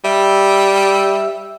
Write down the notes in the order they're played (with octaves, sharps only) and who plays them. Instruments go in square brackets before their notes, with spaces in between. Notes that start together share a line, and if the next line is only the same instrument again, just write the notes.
[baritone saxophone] G3 [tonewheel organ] E5